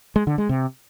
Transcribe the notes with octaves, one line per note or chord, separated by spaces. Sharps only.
G#3
D3
G#3
C3